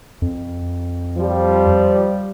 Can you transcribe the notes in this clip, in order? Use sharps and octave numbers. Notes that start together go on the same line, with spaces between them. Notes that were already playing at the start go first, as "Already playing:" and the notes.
F2
F3 G3